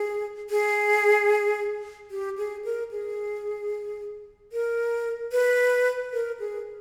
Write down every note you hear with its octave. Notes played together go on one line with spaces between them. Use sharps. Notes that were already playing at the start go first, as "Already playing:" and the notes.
Already playing: G#4
G#4
G4
G#4
A#4
G#4
A#4
B4
A#4
G#4